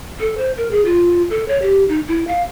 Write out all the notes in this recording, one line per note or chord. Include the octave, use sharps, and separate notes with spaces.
A4
C5
A#4
G#4
F4
A4
C#5
G4
D#4
E4
F5